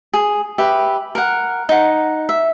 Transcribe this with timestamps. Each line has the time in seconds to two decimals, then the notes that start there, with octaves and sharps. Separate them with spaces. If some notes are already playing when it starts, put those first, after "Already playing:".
0.13 G#4
0.58 G4 B4 E5
1.15 A#4 F#5
1.69 D#4 F#5
2.29 E5